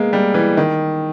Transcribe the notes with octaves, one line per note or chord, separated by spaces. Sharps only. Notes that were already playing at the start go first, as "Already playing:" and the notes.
Already playing: G#3 A#3 B3
G3
E3
D#3